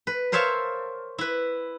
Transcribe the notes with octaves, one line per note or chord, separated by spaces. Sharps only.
B4
A#4 C5 C#5 E5 F5 A5
E4 B4